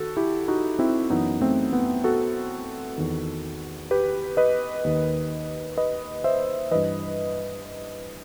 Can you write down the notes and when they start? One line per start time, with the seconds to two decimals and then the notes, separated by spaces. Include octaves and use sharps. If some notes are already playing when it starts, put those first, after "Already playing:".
Already playing: D#3 F#4 A4
0.17 E4 G4
0.48 D#4 F#4
0.79 C4 E4
1.10 F#2 E3 B3 D#4
1.41 A3 C4
1.73 B3
2.04 F#4 A4
2.98 E2 D#3
3.91 G4 B4
4.37 B4 D#5
4.84 D#2 D#3
5.78 B4 D#5
6.24 C5 E5
6.71 G2 E3 B4 D#5